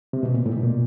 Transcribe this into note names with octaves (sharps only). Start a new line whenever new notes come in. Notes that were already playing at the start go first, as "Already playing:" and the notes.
C3
B2
A#2
A2
B2
A#2